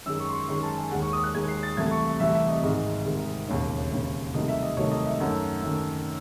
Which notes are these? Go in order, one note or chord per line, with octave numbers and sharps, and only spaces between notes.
F#2 D#3 G#3 E6
C#6
C6
C#6
F#2 D#3 G#3 C#6
A5
G#5
D#2 D#3 G#3 F#5
C#6
D#6
F#6
D#2 D#3 G#3 G#6
C7
A6
C2 C3 E3 A3 G#6
C#6
E5
C2 C3 E3 A3 E5
E5
D#5
G#1 G#2 D#3 G#3 D#5
G#1 G#2 D#3 G#3
E1 D#2 C#3 C#5
C#5
E1 D#2 C#3
C2 C3 D#3 F#3 A3 D#5
E5
D#5
C2 C3 D#3 F#3 A3 C#5
D#5
E5
F#2 D#3 A3 F#5
F#2 D#3 A3